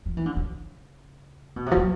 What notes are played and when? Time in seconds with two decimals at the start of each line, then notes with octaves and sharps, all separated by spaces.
0.06 F3
0.17 E3
0.26 D3
0.37 C#3
1.56 B2
1.66 C3
1.71 F3
1.77 F#3